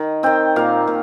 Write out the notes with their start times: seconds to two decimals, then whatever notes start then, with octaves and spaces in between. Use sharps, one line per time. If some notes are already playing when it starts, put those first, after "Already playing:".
Already playing: D#3
0.23 D#3 C4 G5
0.56 A#2 A#3 F5
0.87 A#2